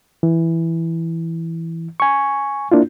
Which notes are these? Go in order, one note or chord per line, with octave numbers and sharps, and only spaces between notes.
E3
G#5 C#6
A#3 D4 E4 F4